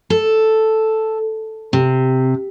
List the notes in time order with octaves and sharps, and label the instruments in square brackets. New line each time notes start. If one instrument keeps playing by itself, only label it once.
[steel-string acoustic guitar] A4
C3